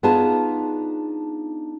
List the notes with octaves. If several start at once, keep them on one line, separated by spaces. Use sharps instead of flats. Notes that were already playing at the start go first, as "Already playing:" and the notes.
B3 D4 D#4 F4 G#4 A5